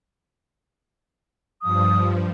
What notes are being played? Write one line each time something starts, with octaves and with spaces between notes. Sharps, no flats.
G2 F3 D#6